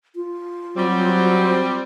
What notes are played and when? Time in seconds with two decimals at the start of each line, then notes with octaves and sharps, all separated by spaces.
0.16 F4
0.77 F#3 G3 C4